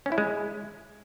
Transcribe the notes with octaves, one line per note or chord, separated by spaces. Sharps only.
C#4
E4
G#3